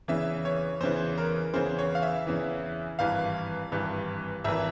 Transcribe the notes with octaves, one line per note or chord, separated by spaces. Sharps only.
E2 C#3 E3 E5
C#5
E2 C#3 E3 C5
A#4
E2 C#3 E3 C5
C#5
F5
E5
E2 C#3 E3
G#1 G2 E3 F5
G#1 G2 E3
G#1 E3 E5